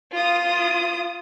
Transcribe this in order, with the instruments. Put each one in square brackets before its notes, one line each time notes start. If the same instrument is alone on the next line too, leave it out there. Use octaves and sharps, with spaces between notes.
[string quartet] F4 D#6